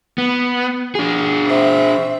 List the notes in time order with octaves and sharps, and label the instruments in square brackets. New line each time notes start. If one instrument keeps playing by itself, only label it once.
[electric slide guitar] B3
D4 G#4
[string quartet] C4 E5